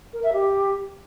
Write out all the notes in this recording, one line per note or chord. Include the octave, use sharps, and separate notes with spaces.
A#4
E5
G4